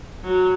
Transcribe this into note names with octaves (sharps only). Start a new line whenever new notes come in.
F#3